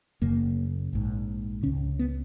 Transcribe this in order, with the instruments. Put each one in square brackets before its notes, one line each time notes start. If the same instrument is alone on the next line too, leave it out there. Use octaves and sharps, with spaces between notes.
[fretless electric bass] F#1 F#2 C#3 A#3
A#1 G#2
C#3 C#4
C#2
B3